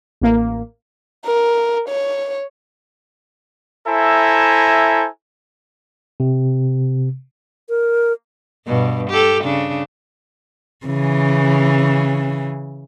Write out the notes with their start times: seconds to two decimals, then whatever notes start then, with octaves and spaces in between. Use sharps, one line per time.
0.21 A1 A#3
1.25 A#4
1.89 C#5
3.88 E4 A4 C5 E5 G#5 A#5
6.20 C3
7.68 A#4
8.67 G2 B2
9.10 G4 A4
9.43 C#3 D4
10.86 C#3 E3